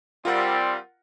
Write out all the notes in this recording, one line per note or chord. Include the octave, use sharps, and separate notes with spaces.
G3 C4 F4 A#4 F#5